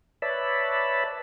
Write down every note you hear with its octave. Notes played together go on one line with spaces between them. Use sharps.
B4 C#5 D5 E5 A5 B5